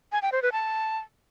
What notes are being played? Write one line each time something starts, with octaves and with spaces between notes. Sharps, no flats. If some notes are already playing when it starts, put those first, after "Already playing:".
G#5
G5
C5
B4
A5